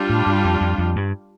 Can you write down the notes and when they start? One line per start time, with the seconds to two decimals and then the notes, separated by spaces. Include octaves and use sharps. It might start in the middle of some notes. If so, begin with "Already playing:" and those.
Already playing: G3 D4 F4
0.09 A2
0.26 G2
0.45 F2
0.61 F2
0.78 F2
0.96 G2